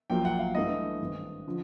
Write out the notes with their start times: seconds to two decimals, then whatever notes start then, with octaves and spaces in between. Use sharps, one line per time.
0.10 A#1 A#2 F#3 A#3 G5
0.25 F#5
0.39 F5
0.55 G2 E3 A3 D#5
1.00 G#1 G2 D#3
1.47 D3 F3